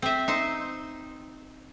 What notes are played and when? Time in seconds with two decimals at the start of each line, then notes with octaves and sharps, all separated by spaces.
0.02 C4 E5
0.28 D#4 C5